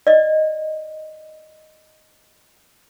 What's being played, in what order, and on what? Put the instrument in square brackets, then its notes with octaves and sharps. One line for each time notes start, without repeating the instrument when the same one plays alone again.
[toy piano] D5 D#5